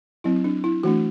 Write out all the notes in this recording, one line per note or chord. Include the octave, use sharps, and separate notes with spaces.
F#3 C4 E4
D4
E4
E3 A3 D4 F#4